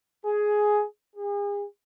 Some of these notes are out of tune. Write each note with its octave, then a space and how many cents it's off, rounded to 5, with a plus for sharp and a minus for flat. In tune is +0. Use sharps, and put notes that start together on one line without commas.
G#4 +10
G#4 -40